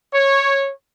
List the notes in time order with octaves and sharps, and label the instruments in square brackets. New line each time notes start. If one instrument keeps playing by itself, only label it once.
[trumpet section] C#5